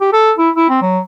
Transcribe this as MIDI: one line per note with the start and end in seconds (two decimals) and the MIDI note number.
0.01 0.12 67
0.13 0.32 69
0.38 0.49 64
0.56 0.68 64
0.69 0.79 60
0.82 0.99 54